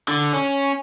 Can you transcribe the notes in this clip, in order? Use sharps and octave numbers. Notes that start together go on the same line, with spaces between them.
D3
C#4